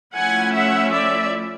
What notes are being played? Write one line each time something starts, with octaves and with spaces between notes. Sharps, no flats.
F3 A3 C#4 E4 F#5 G#5
E5 F#5
D5 E5